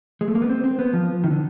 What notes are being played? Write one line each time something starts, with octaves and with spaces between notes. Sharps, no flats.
G#3
A3
A#3
B3
C4
C4
B3
F3
D#3
D3